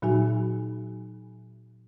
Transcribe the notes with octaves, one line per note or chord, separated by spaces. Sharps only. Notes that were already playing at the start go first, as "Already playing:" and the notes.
A#2 F#3 D#4 F#4 G#5